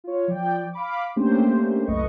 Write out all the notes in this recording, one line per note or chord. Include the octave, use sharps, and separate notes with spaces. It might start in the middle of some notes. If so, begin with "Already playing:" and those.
F4 C#5
F3 D5 G5
F5 B5 D6
A3 A#3 C#4 D4 G4 C5
C2 F#2 A3 B4 D#5 C#6